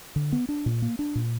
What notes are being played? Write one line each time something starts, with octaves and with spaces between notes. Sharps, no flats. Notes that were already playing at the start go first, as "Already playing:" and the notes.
D3
B3
D4
A#2
A#3
D4
A#2